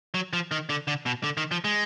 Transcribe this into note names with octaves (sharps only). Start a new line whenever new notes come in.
F#3
F3
D#3
D3
D3
B2
D3
D#3
F3
G#3